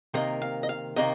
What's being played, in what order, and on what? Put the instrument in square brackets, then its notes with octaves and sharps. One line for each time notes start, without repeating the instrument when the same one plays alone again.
[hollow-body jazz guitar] C3 D#3 A#3 D#5
F5
D#5
F5
C3 D#3 A#3 D#5